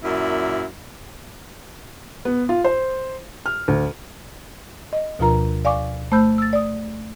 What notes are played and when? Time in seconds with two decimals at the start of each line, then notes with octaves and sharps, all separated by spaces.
0.02 F#2 A#2 E4
2.25 B3
2.49 F4
2.64 C5
3.46 F6
3.68 D2
4.93 D#5
5.19 D2 B2 F3 F4 A#4 A#5
5.65 D5 F5 G#5 C#6 D6
6.12 A3 C5 B5 E6 G6
6.38 E6 A6
6.53 D5 D#6